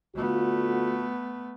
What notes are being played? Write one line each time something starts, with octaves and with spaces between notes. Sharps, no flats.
D3 A3 B3 F4 F#4